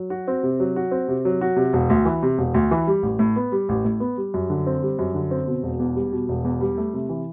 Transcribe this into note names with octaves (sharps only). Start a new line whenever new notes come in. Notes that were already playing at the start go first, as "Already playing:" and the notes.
Already playing: F#3
F#4
C4
C3
F#3
F#4
C4
C3
F#3
F#4
C3
E1
D2
E3
C3
E1
D2
E3
G3
A1
A2
B3
G3
A1
A2
B3
G3
F#2
D3
C4
G3
F#2
D3
C4
B2
E1
E2
G3
B2
E1
E2
G3
A3
C3
E3